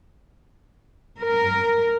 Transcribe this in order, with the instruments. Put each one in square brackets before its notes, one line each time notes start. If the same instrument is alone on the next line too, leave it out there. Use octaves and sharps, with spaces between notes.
[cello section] A#4